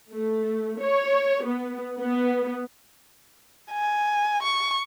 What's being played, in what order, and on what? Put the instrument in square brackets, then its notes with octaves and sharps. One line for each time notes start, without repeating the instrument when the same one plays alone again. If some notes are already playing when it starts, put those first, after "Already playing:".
[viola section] A3
C#5
B3
B3
[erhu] G#5
C#6